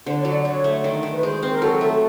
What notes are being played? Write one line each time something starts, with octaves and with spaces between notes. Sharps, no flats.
D3 C5
C#5
F#3
D5
D3 C#5
A3
D#3
D#3
B4
G#3 C5
C4
A#4
F#3 A4
A3 A4